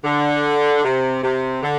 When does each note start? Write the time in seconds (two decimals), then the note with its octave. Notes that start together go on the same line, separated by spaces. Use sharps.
0.04 D3
0.84 C3
1.23 C3
1.63 D3